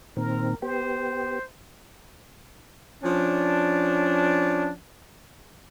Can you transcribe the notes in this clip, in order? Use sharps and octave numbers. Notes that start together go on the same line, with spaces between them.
A#2 D#3 C4 A#4
B3 G4 C5
F3 C#4 D4